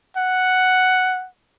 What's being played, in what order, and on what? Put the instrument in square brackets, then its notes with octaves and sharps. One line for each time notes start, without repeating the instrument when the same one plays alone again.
[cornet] F#5